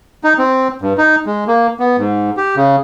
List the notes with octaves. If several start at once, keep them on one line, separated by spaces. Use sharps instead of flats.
D#4
C4
G2
D#4
G#3
A#3
B3
G#2
G4
C#3